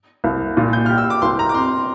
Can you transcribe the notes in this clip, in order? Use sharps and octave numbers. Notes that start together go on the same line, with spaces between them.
C2
A#2
G6
G4 F6
E6
D6
C2 C6
A#5
D6
C4 C6